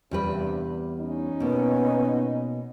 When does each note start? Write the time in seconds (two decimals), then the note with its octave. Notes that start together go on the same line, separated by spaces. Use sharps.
0.11 E2 G2 C3 G3 B4
1.00 C#4 D#4
1.40 B2 A#3 B3